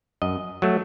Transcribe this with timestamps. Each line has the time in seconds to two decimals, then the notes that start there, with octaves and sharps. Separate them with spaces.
0.22 F#2 D#5
0.62 F#3 A3